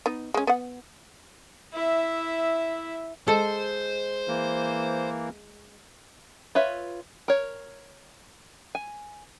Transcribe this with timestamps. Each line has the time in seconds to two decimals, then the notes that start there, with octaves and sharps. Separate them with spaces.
0.06 B3 D#4
0.34 G#3 C#4
0.47 B3 F#5
1.73 E4 E5
3.28 G#3 A4 C5
4.28 E3 A#3
6.55 F4 B4 C#5 E5
7.28 A#4 C#5
8.75 G#5